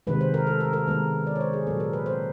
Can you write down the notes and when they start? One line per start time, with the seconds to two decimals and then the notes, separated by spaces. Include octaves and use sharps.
0.07 C3 D#3 G#3 B4
0.21 C5
0.34 A#4
0.47 A4
0.60 A#4
0.73 A#4
0.87 D#3 G#3 B3 B4
1.27 D5
1.36 C#5
1.41 C5
1.53 G#4
1.67 A#2 F#3 B3 A4
1.80 A#4
1.93 B4
2.06 C5